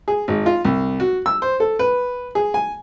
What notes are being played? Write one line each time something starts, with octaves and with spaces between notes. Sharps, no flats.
G#4
G#1
F4
C2
F#4
E6
C5
A4
B4
G#4
G#5